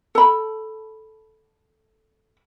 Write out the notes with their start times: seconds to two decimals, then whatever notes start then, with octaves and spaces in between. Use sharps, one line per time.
0.15 A4 B5